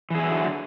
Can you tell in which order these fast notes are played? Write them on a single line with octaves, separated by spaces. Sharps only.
E3 G#4 E4 F#3 D3